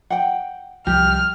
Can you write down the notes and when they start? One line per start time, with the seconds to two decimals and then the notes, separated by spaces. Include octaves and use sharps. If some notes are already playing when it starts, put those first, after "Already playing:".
0.10 F#5 G5
0.87 C2 F3 G3 G4 F6